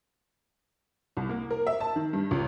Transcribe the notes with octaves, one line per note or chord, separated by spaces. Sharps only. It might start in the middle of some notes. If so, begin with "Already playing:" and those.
C2
A#3
A#4
E5
A5
D#3
G2
C#2